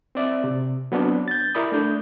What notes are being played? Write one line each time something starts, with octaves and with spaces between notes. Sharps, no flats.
C4 D5 E5
C3
F#3 B3 C4 D4
G6 A6
E4 A#4 D5 B5 D#6
A3 D4 G6